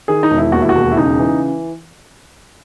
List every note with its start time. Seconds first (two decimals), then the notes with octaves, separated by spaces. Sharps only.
0.08 D#3 G#4
0.23 D#4
0.31 E1
0.38 E4
0.52 D#2 F#4
0.61 E4
0.69 F#4
0.75 E1
0.92 E4
0.97 C#3 D#4
1.19 E3